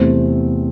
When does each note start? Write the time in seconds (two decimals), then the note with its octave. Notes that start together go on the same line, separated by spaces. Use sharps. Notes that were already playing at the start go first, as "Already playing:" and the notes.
Already playing: E2 C3 A3 C4